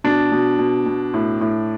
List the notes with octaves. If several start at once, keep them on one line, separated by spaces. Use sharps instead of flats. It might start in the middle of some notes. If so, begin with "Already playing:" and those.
B2 D4
B2
B2
B2
A2
A2